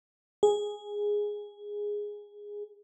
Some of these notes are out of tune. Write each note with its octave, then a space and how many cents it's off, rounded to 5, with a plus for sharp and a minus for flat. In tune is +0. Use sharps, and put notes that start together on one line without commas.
G#4 -5